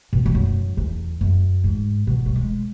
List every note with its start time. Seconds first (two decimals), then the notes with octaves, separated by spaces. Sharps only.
0.13 B2
0.26 E2
0.35 F#2
0.77 E2
1.21 F#2
1.64 G#2
2.07 B2
2.26 F#3
2.35 G#3